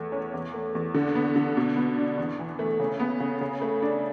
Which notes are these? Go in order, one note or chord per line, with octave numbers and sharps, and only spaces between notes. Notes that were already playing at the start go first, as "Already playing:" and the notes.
Already playing: E2 A3
C#4
E2
A3
E2
D3
B3
D3
B2
B3
D4
E2
E3
A3
C#3
B3
C#3
C#3
A3
D4